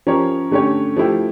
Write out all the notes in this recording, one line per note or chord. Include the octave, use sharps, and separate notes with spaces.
F3 C#4 G4 A#4 C#5
D3 A3 C#4 G4 C#5
F3 A3 E4 G4